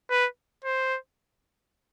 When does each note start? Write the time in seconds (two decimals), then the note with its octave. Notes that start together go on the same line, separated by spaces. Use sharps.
0.10 B4
0.65 C5